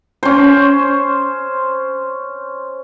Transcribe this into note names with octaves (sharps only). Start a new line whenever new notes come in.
C#4 C5